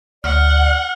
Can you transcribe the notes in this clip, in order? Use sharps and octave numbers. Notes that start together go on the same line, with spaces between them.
D2 D5 F#5 F6